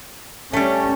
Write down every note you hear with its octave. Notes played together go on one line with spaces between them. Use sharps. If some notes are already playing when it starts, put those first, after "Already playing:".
G3 A3 C#4